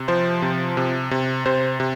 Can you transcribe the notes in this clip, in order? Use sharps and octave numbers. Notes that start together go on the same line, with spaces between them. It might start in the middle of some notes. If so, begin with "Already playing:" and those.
Already playing: C3
F3 C5
C3
C3
C3
C3 C5
C3